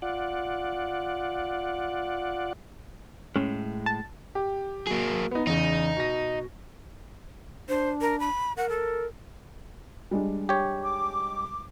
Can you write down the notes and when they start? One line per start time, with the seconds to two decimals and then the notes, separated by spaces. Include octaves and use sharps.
0.02 F4 D5 F#5
3.36 A2 G#3 C#4
3.86 A5
4.35 G4
4.87 F#3 A#3 G#4
5.31 B3 D#4
5.47 E2 C#3 D#4
5.97 B2 A#6
7.69 D4 C5
8.01 A#4
8.20 B5
8.57 A#4 F#5
8.69 A4
10.11 G3 G#3 D4
10.49 G4 C#5
10.82 D6